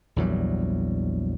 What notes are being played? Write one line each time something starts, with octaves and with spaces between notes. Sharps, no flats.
A#1 E2 F#3 G3